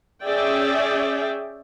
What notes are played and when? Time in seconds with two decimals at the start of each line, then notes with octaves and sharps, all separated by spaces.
0.24 C#4 G#4 D5 E5 G5